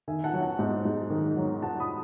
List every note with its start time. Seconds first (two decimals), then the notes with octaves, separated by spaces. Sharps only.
0.08 D#3 E5 G#5
0.24 F#5 A5
0.34 F#3
0.41 F#5 A5
0.59 G#2
0.85 G#2
1.10 D#3
1.37 F#3
1.62 G#2 F#5 A5
1.80 B5 D#6